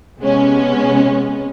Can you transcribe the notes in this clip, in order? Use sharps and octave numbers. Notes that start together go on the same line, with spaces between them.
C3 G#3 B3 C#4